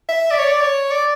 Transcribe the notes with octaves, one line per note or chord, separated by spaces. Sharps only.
E5
D5
C#5
D5
C#5
D5